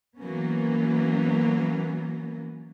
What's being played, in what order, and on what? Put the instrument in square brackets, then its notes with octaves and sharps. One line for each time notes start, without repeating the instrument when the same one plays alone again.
[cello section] E3 F#3 A#3 B3 C#4